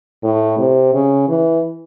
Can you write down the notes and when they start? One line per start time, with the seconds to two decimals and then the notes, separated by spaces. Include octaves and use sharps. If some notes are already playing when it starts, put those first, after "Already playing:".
0.23 A2
0.58 C3
0.94 C#3
1.29 E3